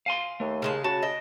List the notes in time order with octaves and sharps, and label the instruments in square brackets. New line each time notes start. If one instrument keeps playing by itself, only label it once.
[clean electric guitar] F5 G#5 C6
[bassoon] D#2 [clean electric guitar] A3
[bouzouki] C#3 G#3 A5
[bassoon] C#3 [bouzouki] F#4 [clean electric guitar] A5
[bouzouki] D#5 G5